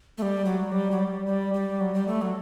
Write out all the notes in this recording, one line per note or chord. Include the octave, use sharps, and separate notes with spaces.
A3
G3
F#3
G3
F#3
G3
G3
G3
F#3
G3
A3
F#3